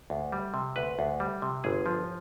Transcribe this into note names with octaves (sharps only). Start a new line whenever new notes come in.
D2
G3
C3
D2 B4
D2
G3
C3
G1 G#4
F3